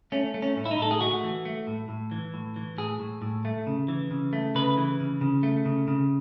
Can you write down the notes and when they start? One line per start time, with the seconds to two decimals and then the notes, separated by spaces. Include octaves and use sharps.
0.12 A3 C#4
0.34 A3
0.42 C#4
0.56 A2
0.66 E4
0.71 D#4
0.79 A2 A4
0.91 G#4
1.00 A3 F#4
1.24 E3
1.45 A3
1.67 A2
1.89 A2
2.11 E3
2.34 A2
2.56 E3
2.78 A2 G#4
3.00 A2
3.22 A2
3.45 A3
3.67 C#3
3.88 E3
4.11 C#3
4.33 A3
4.55 C#3 B4
4.77 E3
5.00 C#3
5.21 C#3
5.43 A3
5.65 C#3
5.88 C#3